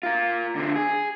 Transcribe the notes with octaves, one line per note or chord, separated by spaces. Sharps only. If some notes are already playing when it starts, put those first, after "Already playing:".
F4 A#4
D3 C4
G#4